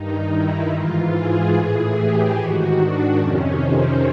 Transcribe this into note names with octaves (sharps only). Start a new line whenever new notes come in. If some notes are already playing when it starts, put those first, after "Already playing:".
Already playing: G2 D#3 D#4
E4
G#2 E3 F4
G#4
A2 E3 G#4
G4
G#2 D#3 F#4
D4
F2 C3 D#3 C#4
C4